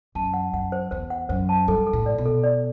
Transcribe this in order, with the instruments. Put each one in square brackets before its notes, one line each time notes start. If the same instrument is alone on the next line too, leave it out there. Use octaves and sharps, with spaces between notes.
[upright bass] F#2 [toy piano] A5
[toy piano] F#5
[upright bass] F#2 [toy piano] F#5
[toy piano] C5
[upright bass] E2 [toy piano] C5
[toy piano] F#5
[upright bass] F#2 [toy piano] C5
[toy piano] A5
[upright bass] G2 [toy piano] A4
[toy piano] A4
[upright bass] A2
[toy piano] D5
[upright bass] B2
[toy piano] A4
D5